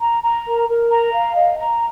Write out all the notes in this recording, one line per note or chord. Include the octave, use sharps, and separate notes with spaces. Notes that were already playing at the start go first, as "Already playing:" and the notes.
A#5
A#5
A#4
A#4
A#5
F5
D#5
A#5